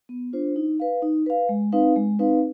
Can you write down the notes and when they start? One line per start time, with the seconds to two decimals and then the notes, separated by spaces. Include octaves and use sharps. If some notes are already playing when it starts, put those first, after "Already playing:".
0.09 B3
0.33 D4 F4 C5
0.56 D#4
0.80 B4 F5
1.02 D#4
1.26 B4 F5
1.49 G#3
1.72 C4 D#4 B4 F5
1.96 G#3
2.19 C4 D#4 B4 F5